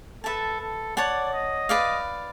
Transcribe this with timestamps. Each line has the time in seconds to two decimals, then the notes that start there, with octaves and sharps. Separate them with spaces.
0.24 A4 B4 E5 A5
0.60 A4
0.97 C#5 D5 F#5 A5
1.33 D#5
1.69 B4 D5 F5